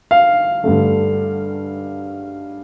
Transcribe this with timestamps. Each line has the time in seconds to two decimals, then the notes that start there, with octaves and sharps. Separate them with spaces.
0.11 F5
0.64 G2 D3 A3